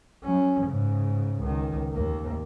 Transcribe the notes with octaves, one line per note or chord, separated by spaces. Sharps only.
F#3 C#4
G#2 C#3
C#2 D#3
D#2 A#3